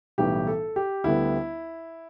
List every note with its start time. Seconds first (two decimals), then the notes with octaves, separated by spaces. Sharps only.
0.18 B1 A2 E3 G3 B3 G4
0.47 A4
0.76 G4
1.04 D2 D3 G3 B3 E4